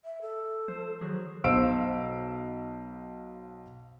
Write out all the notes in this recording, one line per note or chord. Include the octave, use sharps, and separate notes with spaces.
E5
A4
F3 C5
D#3 F#3 F#4 G#4
B1 C5 F5 E6 D7